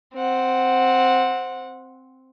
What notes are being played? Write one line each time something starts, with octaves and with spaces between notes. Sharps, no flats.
C4 F#5